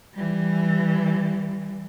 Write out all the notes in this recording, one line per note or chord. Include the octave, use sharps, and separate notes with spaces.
E3 G3